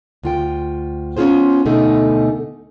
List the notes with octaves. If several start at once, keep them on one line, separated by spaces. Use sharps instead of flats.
D2 F4 G5
B3 C#4 D#4 F4 G#4 C5
D2 B2 D3 A3 D#4 G#4